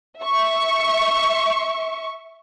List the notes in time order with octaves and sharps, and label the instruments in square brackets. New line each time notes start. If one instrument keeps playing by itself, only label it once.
[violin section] E5 C#6